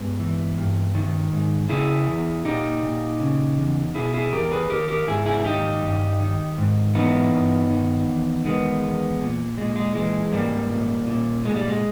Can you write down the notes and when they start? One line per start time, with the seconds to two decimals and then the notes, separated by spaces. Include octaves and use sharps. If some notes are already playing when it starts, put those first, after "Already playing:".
Already playing: G2 G#3 B3
0.20 E3
0.58 G2
0.95 D#3
1.33 G#2
1.69 C#3 E4 G#4
2.07 E2
2.45 A#2 D#4 G4
2.83 A#2
3.20 C#3
3.58 E2
3.94 B2 E4 G#4
4.14 E4 G#4
4.32 E2 G4 A#4
4.51 G#4 B4
4.69 D#3 G4 A#4
4.88 G4 A#4
5.07 G#2 E4 G#4
5.26 E4 G#4
5.40 G#4
5.44 D#3 D#4 G4
5.82 G2
6.20 D#3
6.58 G#2
6.95 E3 B3 D#4
7.33 G2
7.71 D#3
8.08 E2
8.45 D#3 G#3 B3
8.83 E2
9.21 A#2
9.57 A#2 G#3
9.76 G#3
9.95 E3 G#3
10.32 G#2 G3 A#3
10.71 A#2
11.07 A#2
11.45 A#2 G#3
11.56 G3
11.68 G#3